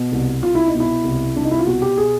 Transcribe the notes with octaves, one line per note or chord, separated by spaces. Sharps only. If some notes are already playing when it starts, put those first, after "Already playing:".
Already playing: B2
C2
C2 F4
E4
D#4
B2
E4
C2
C2 D4
D#4
E4
F4
B2 F#4
G4
B2 G#4